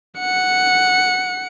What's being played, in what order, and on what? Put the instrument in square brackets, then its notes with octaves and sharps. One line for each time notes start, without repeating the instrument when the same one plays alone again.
[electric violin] F#5 C#7